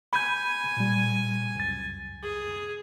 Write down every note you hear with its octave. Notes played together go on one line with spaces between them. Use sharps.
G#5 B5 G6
A#2 G3
C#2 F#2 A6
G#4